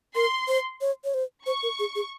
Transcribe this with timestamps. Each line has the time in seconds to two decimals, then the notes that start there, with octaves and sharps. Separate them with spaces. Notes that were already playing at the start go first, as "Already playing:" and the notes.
0.15 A#4 C6
0.48 C5
0.81 C#5
1.04 C#5
1.14 C5
1.46 C5 C#6
1.63 A#4
1.79 G#4
1.95 G#4